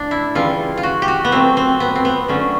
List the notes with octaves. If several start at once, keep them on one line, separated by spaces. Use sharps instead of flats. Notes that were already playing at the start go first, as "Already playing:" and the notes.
Already playing: A2 F3 D4
E4
C#3 E3 G3 F4
F4
F#4
G4
F#4
B3
A#2 F#3 A3 C4
C4
B3
C4
B3
D3 F#3 A3 C#4